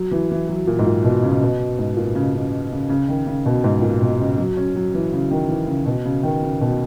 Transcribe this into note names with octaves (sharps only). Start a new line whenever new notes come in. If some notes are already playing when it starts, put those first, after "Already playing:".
Already playing: F#3
E3
E3
F#3
A#2
G#2
A#2
B2
C#3
B2
G#2
A#2
C#3
C#3
C#3
C#3
D#3
C#3
B2
G#2
A#2
B2
C#3
F#3
C#4
F#3
E3
C#3
D#3
E3
C#3
B2
C#3
D#3
C#3
B2